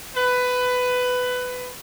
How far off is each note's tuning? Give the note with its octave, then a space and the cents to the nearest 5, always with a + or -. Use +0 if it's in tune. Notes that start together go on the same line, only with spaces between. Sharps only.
B4 +15